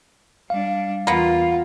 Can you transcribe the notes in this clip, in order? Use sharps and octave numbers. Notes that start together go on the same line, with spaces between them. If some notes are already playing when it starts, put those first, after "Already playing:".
G3 D4 F5
E2 A#3 B3 F4